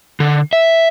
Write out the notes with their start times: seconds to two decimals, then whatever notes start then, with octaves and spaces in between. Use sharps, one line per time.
0.20 D3
0.53 E5